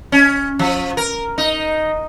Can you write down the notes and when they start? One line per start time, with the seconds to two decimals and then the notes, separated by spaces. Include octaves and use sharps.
0.12 C#4
0.59 F3
0.97 A#4
1.38 D#4